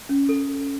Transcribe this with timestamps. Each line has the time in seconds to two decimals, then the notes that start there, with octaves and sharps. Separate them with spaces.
0.09 C#4
0.29 A4